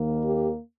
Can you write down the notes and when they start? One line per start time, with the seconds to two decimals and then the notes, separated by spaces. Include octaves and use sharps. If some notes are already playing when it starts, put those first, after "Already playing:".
Already playing: D#2 D#3 A#3
0.24 G4